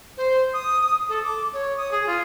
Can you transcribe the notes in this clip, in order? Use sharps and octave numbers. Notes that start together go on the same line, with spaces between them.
C5
D#6
A4
D6
C#5
D#6
G#4
F4